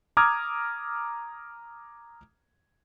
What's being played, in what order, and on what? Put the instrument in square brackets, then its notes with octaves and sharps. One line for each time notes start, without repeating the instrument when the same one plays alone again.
[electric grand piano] A#5 D6 D#6 F6 G#6